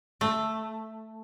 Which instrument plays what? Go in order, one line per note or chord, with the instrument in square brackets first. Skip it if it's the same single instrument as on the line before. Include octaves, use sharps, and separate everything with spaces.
[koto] A3